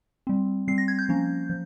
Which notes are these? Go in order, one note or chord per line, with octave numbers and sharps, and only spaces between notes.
G3 C4
G3 C4 C7
A#6
G#6
G6
F3 A#3 C#4
F3